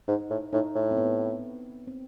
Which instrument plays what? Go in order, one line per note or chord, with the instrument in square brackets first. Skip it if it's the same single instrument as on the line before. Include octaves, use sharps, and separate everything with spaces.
[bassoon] G#2 [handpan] D#4
[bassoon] A2
[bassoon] A2 [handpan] D#4
[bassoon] A2
[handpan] C4
B3
C4